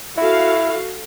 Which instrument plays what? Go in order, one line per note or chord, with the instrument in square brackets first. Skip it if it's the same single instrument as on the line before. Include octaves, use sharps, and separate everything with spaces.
[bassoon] E4 [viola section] F#4 A4 F5